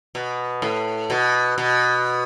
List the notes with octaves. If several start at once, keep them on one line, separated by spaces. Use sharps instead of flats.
B2
A2
B2
B2